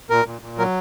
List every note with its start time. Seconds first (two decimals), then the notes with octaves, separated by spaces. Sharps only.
0.10 A#2 A#4
0.26 A#2
0.41 A#2
0.58 F#3 A#4